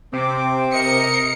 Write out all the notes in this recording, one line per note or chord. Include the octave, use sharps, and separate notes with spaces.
C3 C4 D6
A#4 D#5 C#7